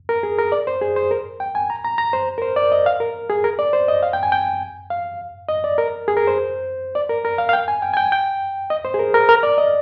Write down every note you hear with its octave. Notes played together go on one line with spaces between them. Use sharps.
A#4
G#4
A#4
D5
C5
G#4
C5
A#4
G5
G#5
A#5
A#5
A#5
C5
A#4
C5
D5
D#5
F5
A#4
G#4
A#4
D5
C5
D#5
F5
G5
G#5
G5
F5
D#5
D5
A#4
G#4
A#4
C5
D5
A#4
A#4
F5
F5
G5
G#5
G5
G#5
G5
G5
D#5
C5
G#4
A#4
A#4
A#4
D5
D#5